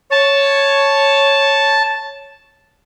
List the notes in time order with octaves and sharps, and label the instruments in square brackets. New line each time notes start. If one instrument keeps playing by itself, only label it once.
[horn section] C#5 [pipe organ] A5